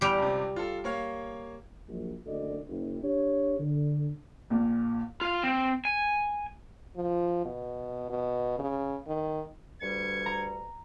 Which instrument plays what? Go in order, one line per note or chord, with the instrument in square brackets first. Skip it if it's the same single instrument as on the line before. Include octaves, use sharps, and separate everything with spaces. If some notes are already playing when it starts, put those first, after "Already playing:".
[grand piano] E2 G6 F7 [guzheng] G3 G4
[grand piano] C#2 C3
F4 A4
A#3 C#5 F5
[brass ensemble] A#1 F3 F#3
F#1 D2 D4 A4 D5 D#5
F#1
D4 G4 C#5
D3
[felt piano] A#1 A#2
[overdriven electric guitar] F4 F5
C4
G#5
[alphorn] F3
B2
B2
C#3
D#3
[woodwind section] D2 G2 G3 [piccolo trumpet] G#6 [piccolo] C#7
[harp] A#5